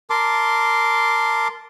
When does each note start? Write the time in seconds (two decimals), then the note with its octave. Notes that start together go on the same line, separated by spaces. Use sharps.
0.10 A#4 A5 C6 D6